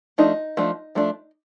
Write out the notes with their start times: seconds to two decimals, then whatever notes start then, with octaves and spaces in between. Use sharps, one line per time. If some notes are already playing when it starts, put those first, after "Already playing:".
0.18 F3 A3 D4 D#4
0.57 F3 A3 D4
0.95 F3 A3 D4